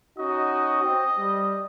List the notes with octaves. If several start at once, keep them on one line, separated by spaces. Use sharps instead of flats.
C#4 D#4 F#4 D#5
C4
G3